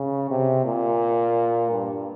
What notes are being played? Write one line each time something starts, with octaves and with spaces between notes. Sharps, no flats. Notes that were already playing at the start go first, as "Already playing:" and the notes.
Already playing: C#3
C3
A#2
G2